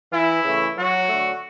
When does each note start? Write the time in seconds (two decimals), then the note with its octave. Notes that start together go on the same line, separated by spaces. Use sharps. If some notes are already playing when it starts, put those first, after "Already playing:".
0.12 E3 E4
0.44 C#3 E3 A3
0.77 F#3 F#4
1.08 D3 F#3 A3